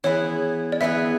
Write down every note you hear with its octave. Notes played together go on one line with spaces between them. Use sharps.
E3 B3 E4 G#4 B4 C#5
D5
E3 B3 E4 G#4 B4 E5